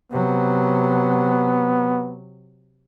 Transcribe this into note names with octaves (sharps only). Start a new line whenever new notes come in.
C3 F#3 B3